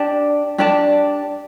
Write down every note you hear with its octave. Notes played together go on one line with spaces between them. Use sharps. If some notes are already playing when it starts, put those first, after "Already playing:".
Already playing: D4 G4 D5 A5
D4 G4 D5 A5